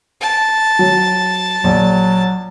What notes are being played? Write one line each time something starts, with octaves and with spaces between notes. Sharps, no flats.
A5
F#3
A#1 F#3